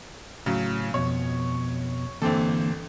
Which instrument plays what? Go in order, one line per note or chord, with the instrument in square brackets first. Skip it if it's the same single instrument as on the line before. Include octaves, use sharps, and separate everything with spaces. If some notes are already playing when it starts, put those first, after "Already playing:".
[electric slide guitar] A2 [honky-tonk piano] C#3 F#3
[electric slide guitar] F2 B2 [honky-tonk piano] C#5
[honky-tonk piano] G1 C4 A4 [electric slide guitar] D3 E3 A#3